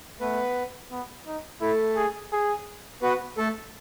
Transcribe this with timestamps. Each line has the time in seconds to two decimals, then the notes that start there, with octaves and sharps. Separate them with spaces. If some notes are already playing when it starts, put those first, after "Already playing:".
0.20 A3 B3 B4
0.92 B3
1.27 D#4
1.61 A3 E4 A4
1.97 G#4
2.33 G#4
3.02 B3 F#4 B4
3.38 A3 A4